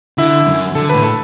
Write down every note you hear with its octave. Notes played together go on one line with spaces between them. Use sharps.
D3 E4
F#2
D3 A4
A2 B4
A4